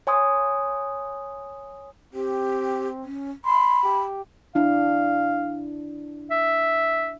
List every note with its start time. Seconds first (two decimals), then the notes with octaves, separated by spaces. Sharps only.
0.07 C#5 G#5 C6 D#6
2.14 C4 G4
3.04 C#4
3.45 B5 C6
3.83 G4
4.55 D4 E4 F5
6.31 E5